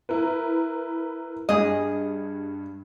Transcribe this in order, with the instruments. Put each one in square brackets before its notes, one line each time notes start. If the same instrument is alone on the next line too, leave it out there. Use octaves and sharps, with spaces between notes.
[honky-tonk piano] E4 A#4 B4
[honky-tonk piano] G2 [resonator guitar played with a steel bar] G#4 D#5